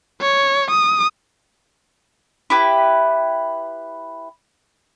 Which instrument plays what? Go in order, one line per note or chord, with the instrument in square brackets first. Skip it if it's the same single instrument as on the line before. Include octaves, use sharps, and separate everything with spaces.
[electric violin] C#5
D#6
[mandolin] E4 G4 B4